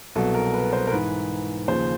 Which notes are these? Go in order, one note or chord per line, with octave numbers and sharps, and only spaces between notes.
C2 B2 F#3 A4
A#4
B4
C5
A#4
G#2 E3 B4
D#2 C#3 F3 C5